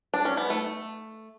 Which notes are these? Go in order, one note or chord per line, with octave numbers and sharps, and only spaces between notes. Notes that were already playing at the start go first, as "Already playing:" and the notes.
D4
C#4
B3
A3